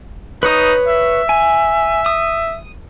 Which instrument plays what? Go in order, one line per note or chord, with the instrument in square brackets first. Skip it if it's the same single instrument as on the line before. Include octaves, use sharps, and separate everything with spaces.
[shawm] D#4 [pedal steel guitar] B4 C#5 D#6
[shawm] E5
[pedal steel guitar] G#5
D#6